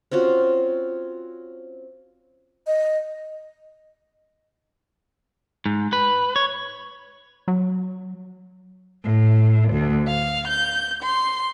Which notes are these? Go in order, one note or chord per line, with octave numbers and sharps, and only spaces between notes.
C4 C#4 F4 F#4
D#5
G#2
B4
C#5
F#3
A2
D2
F5
G6
C6